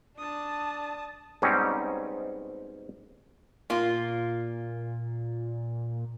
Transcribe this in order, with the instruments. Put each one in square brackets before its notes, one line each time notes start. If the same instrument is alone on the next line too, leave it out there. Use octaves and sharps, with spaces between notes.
[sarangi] D4 [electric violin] A5 D#6
[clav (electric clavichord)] G#2 B2 G3 C4 C#4 D#4
[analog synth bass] A#2 [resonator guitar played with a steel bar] A#3 F4